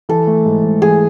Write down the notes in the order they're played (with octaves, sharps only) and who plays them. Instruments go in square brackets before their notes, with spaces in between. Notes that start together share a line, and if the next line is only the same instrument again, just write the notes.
[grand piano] E3 [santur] A4
[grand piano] A3
G#2
G#2
[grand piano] E3 [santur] G#4